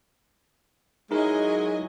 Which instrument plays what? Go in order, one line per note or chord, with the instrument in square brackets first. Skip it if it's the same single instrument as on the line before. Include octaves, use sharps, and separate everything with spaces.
[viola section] F#3 D#5 G#5 [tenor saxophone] G#3 [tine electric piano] D#4 E4 A#4